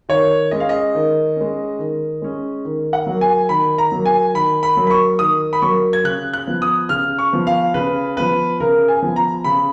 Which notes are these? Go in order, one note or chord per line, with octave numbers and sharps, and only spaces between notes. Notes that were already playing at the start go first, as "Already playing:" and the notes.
D#3 C#5
G#3 C#4 D#5
F5
D#5
D#3
G#3 C#4
D#3
G#3 C#4
D#3
F#5
F#3 A#3
G#5
D#3 B5
A#5
F#3 A#3
G#5
D#3 B5
B5
F#3 A#3
B5
C#6
D#3 D#6
B5
F#3 A#3 C#6
G#6
C#3 F#6
F#6
F3 B3
D#6
C#3 F6
C#6
F3 B3
F5
C#3 B4
F3 B3 B4
C#3 A#4
G#5
F3 B3
A#5
C#3 B5